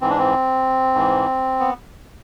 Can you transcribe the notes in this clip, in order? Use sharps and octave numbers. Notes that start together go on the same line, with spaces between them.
G#2 E3 C4
D4
C4
G#2 E3
B3